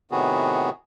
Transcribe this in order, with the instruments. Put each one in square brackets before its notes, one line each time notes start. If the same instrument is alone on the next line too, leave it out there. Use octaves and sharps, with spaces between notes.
[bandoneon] A2 C3 D#3 B3 F#4 G#4